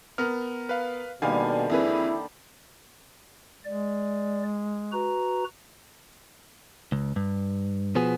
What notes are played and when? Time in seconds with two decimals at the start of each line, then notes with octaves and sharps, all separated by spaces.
0.18 B3 A#4 F6
0.69 B4 F5
1.22 B2 D3 D#3 G3 A#3 F5 G#5
1.70 F2 E4 G#4 B4
3.65 G#3 D5
4.92 F#4 B4 A#5
6.92 C#2
7.16 G2
7.95 B2 F3 B3 G#4